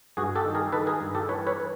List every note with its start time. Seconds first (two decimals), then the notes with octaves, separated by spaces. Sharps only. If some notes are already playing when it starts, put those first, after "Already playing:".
0.17 G2 F#4 G#4
0.36 G4 A4
0.45 D#3
0.55 G#4 A#4
0.72 D#3 A4 B4
0.87 G#4 A#4
1.01 G2
1.15 G4 A4
1.29 E3 B4 C#5
1.47 B4 C#5